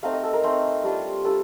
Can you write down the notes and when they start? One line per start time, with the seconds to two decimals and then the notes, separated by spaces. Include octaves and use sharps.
0.03 A3 C4 D#4 F5
0.13 D#5
0.23 A4
0.33 A#4
0.43 A3 C4 D#4 C5
0.83 G3 D4 F4
1.25 G3 D4 F4 A4